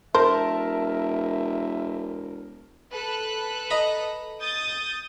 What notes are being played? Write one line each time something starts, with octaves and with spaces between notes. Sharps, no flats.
E1 A#4 C5 E5 A5
A4 B4 F#6
D#5 A#5 B5
D#6 G6 A6